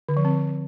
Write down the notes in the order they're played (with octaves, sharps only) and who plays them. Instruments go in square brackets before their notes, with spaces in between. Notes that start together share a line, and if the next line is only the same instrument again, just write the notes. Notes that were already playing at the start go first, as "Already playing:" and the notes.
[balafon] D3
F3
C4